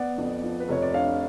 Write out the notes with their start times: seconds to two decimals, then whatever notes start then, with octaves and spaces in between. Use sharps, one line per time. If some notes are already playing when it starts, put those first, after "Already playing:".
Already playing: B3 D5 F#5
0.18 F2
0.43 F3
0.60 B4
0.69 F1 C#5
0.82 D5
0.94 D4 C#5 F5